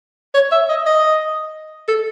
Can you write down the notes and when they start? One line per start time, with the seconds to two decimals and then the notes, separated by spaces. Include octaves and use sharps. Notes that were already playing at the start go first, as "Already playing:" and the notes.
0.34 C#5
0.52 E5
0.69 D#5
0.86 D#5
1.88 A4